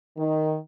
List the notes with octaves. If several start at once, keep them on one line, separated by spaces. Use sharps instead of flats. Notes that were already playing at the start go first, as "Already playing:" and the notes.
D#3